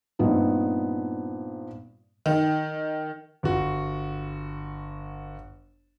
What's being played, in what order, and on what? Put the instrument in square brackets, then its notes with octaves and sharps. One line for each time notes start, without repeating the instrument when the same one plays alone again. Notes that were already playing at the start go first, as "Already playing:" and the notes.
[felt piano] G2 A#2 B3 C4 D#4
[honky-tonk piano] D#3
[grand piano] G1 F#4